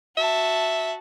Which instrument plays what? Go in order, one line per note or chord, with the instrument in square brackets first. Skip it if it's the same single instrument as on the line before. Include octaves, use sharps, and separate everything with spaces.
[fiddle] F#4 A5 [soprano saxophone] E5